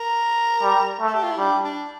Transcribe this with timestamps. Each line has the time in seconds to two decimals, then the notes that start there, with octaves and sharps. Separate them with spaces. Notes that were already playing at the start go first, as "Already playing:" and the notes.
Already playing: A#4
0.62 G3
1.00 A3
1.06 A4
1.14 G4
1.23 F4
1.31 E4
1.38 G3 D4
1.64 D4